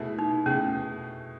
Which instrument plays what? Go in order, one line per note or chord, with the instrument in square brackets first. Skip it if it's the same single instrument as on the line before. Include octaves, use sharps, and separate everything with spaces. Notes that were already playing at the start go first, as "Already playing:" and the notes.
Already playing: [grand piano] B2 A3 E4 G#4
[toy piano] D#4
[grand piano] B2 A3 E4 G#4 [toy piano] C#4